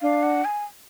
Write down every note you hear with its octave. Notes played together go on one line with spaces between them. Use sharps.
D4 F5
F#5
G#5